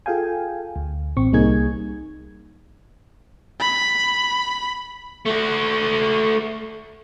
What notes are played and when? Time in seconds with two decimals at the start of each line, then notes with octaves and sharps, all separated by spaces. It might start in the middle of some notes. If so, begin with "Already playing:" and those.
0.06 F4 G#4 A4 F5 G5 G#5
0.76 D2
1.16 A1 C4 C#6
1.33 C2 G3 A#3 D#4 G#4 G#6
3.61 B5
5.25 A3 F#4